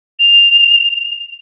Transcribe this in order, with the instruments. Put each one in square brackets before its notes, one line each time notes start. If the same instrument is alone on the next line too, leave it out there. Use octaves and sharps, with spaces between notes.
[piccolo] F7